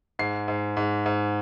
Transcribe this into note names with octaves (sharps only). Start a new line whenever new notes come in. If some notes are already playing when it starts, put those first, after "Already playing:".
G#2 C7
G#2
G#2
G#2